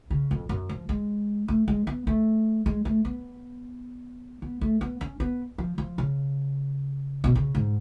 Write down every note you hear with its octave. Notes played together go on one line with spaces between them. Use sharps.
C#3
F2
F#2
F3
G#3
A3
G#3
B3
A3
G#3
A3
B3
B3
A3
B3
C#4
B3
F3
F3
C#3
B2
C#3
G#2